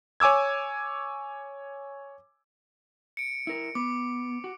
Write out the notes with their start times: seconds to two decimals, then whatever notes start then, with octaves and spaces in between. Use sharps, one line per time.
0.20 C#5 G#5 D6 E6 G#6
3.17 C#7 D7
3.47 E4 A#4
3.75 B3 D6
4.44 F#4